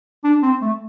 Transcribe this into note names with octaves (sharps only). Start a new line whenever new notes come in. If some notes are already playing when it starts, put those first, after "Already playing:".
D4
C4
A3